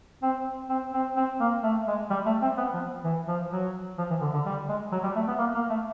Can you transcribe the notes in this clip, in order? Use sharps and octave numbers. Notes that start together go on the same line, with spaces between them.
C4
C4
C4
C4
A#3
A3
G#3
G3
A3
C4
B3
F3
E3
F3
F#3
F3
E3
D3
D3
G3
G#3
F#3
G3
A3
B3
A#3
A#3
A3